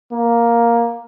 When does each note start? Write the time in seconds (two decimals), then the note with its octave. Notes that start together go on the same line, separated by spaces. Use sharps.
0.12 A#3